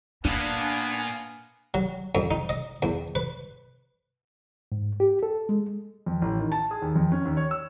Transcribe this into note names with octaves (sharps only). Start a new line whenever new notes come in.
A#2 A#3 B3 D4 F5 G#5
F#3
F2
D#4
D#5
E2
B4
G#2
G4
A4
G#3
F2
A1
D#3
A5
G#4
D#2
F2
C#4
D#2
C#5
E6